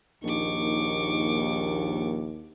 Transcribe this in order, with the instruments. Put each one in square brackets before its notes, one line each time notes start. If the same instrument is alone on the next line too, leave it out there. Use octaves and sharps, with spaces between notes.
[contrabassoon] A#1 [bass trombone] D#2 [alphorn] D#4 [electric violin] C#6 D6